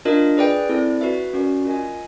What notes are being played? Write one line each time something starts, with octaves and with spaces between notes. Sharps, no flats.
D4 F4 A#4 D#5
G#4 B4 D5 G5
C4 E4 A4 D5
F#4 B4 E5
C#4 F#4 A#4 D5
F4 A#4 D#5 G#5